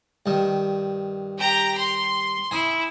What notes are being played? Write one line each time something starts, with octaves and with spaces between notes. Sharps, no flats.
G2 D#3
G4 A#5
C6
E4 G#5 D#6